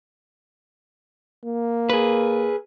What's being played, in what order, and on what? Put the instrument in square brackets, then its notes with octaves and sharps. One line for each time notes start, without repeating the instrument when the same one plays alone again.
[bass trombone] A#3
[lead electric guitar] G#4 B4